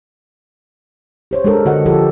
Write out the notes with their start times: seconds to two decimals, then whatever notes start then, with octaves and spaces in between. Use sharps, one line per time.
1.31 G4 C5 C#5
1.45 G#3 D4 A4 A#4
1.65 D3 F#4 D#5 F#5
1.86 F3 G#3 F4 G4 A4